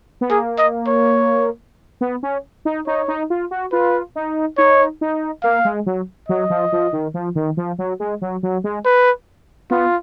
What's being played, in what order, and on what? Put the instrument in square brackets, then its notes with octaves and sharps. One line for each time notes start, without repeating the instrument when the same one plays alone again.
[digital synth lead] B3
[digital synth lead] A#3 [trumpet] G#4
[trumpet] D#5
C#5
[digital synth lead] B3
C#4
D#4
[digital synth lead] D#4 [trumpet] C#5
[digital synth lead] D#4
F4
F#4
[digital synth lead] F4 [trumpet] B4
[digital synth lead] D#4
[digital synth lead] D#4 [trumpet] C#5
[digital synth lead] D#4
[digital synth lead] A#3 [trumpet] F5
[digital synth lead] G#3
F#3
[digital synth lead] F#3 [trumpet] D#5
[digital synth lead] F3
F3
D#3
F3
D#3
F3
F#3
G#3
F#3
F#3
G#3
[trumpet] B4
[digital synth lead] B3 [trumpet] F4